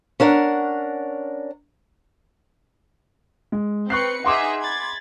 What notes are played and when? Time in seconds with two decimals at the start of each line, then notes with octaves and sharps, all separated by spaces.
0.20 C#4 D4 A#4 F#5
3.52 G#3
3.90 C4 B4 C#6 F#6 C7 C#7
4.24 D#4 G#4 E5 F#5 C6 D6
4.61 B5 G#6 A6